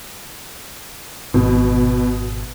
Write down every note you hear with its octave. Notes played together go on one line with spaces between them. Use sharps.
G#1 B2